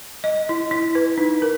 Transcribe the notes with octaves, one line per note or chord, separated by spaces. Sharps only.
D#5
E4
E4
B4
D#4
A#4